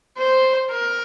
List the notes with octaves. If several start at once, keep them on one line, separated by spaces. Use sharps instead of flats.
C5
A#4